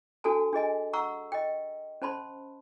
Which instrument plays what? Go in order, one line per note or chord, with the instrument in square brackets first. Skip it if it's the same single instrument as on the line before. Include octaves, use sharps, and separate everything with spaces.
[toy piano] D4 F#4 A4 G#5 A5
D4 G#4 D#5 G#5
F#5 A#5 C#6 E6
D#5 G5
C#4 C5 A5 B5 C6